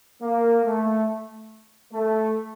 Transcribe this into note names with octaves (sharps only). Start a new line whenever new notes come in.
A#3
A3
A3